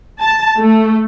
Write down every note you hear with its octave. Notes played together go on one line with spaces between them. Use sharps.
A5
A3